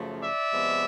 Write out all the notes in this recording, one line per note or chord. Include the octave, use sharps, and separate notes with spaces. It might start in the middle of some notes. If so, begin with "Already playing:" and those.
Already playing: F#2 C#3 F3 A3
D5 E5
C3 F3 G#3 B3